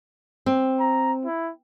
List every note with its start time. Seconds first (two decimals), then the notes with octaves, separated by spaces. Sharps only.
0.46 C4
0.80 A#5
1.25 E4